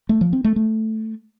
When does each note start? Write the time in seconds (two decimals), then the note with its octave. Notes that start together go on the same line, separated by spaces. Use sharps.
0.09 A3
0.21 F3
0.33 C4
0.44 A3
0.56 A3